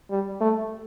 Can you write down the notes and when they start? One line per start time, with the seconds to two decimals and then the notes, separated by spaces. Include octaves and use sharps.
0.10 G3
0.40 A3